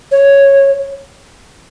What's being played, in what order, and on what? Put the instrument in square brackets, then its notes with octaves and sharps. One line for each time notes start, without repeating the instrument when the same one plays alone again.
[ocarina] C#5